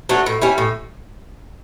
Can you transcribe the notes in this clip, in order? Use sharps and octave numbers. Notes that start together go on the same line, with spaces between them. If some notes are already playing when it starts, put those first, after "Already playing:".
F#3 A3 D4
A2
G3 C#4 E4
A2